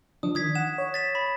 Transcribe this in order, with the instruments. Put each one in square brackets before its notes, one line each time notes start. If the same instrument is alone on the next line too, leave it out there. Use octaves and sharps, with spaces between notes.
[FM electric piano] F3 D4 [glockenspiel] D#6
[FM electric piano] D#3 [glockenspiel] D#6 G#6 B6
[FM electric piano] F#5 [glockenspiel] E7
[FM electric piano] C#5
[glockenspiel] A6 B6 E7
B5